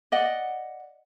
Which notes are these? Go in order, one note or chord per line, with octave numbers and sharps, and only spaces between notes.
D5 D#5 F#5